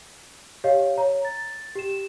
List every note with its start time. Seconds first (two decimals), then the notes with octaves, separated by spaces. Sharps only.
0.64 G4 C#5 D#5 F5
0.98 C#5 A#5
1.25 A6
1.76 G4 E7